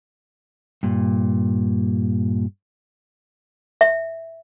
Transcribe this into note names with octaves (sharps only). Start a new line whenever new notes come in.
G2 A#2
E5